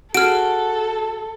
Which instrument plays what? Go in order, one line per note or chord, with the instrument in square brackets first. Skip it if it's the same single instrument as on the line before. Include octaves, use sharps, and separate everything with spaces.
[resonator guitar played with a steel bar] F#4 G#4 [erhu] A4 [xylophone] F6 D7